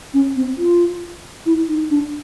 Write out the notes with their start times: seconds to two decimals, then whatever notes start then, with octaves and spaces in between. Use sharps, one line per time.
0.14 C#4
0.36 C4
0.58 F4
1.46 E4
1.69 D#4
1.91 D4